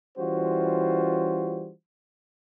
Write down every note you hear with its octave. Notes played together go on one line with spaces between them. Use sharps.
E3 G3 C#4 F4 F#4 C5